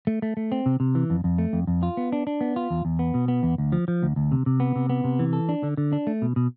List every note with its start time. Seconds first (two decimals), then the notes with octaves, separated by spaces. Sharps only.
0.07 A3
0.22 A3
0.37 A3
0.52 C4
0.66 C3
0.80 C3
0.95 E3
1.10 F2
1.24 F2
1.38 A3
1.53 F2
1.67 F2
1.83 F4
1.97 B3
2.12 D4
2.27 D4
2.41 B3
2.56 F4
2.70 E2
2.85 E2
2.99 B3
3.14 B2
3.28 B3
3.43 E2
3.58 D2
3.72 F3
3.88 F3
4.03 D2
4.16 D2
4.32 C3
4.46 C3
4.60 B3
4.76 C3
4.89 B3
5.04 C3
5.19 E3
5.33 A4
5.49 D4
5.63 D3
5.77 D3
5.93 D4
6.07 A3
6.22 B2
6.36 B2